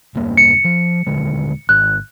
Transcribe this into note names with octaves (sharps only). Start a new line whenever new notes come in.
E1 G2 A#3
C#7
F3
D#1 D3 G#3
G#1 F#6